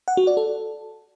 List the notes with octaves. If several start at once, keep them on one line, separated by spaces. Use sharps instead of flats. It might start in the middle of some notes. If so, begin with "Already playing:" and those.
F#5
F#4
D5
A4